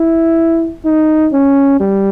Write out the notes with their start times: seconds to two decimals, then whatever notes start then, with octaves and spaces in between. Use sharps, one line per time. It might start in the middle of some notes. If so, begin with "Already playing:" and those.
Already playing: E4
0.85 D#4
1.33 C#4
1.80 G3